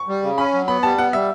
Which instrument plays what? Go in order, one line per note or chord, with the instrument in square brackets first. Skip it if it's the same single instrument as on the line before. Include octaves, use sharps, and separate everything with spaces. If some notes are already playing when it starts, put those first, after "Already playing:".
Already playing: [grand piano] C#6
[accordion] G3
C#3
[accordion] C#4 [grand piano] B5
[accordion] F#3
[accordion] B3 [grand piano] B5
[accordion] G3 [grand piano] A5
[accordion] B3 [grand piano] F#5
[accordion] G3 [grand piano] E5